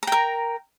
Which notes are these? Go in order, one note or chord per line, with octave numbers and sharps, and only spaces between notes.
A#4 G5 A#5